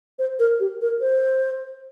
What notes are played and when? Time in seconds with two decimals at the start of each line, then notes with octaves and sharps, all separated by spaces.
0.19 C5
0.39 A#4
0.60 G4
0.81 A#4
1.01 C5